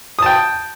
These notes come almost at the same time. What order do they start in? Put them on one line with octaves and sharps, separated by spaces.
D#6 A5 G5